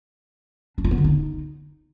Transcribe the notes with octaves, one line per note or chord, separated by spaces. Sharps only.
D4
F4
B3
D3
D#4